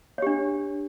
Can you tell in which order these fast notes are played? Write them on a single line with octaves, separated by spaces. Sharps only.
C#5 G4 D4